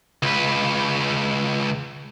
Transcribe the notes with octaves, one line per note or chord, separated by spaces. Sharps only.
C#2 B4